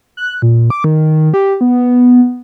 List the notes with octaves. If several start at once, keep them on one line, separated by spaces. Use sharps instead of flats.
F#6
A#2
D6
D#3
G4
B3